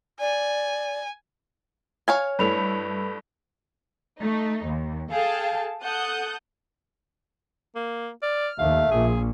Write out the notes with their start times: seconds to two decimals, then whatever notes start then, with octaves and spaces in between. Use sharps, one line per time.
0.20 D5 G#5
2.08 C#5 F5 G#5
2.39 G2 A3 E4 B4 B5 F7
4.20 A3 D#4
4.67 D#2
5.11 G#4 A4 F5 G5 A5
5.82 A4 F#5 A5 D#6 G6
7.75 A#3
8.22 D5 F6
8.59 D#2 A3 F5
8.91 A#1 A#2 G#4